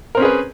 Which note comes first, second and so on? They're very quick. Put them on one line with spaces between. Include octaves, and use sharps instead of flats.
A#4 C4 C#4 G#4 B4